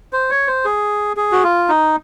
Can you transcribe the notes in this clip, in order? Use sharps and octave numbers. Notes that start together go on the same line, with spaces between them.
C5
C#5
C5
G#4
G#4
F#4
F4
D#4